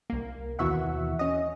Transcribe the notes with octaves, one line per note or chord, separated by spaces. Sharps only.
C2 A#3
D#2 B2 E3 F#4 E5 F#5
C#4 D#5